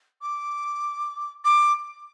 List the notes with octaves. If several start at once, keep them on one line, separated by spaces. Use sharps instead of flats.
D6
D6